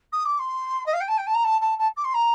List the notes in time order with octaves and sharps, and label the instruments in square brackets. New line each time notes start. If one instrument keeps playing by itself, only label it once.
[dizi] D#6
D6
C6
D#5
F5
G5
A5
G5
A5
A#5
A5
A5
A5
D6
C6
A#5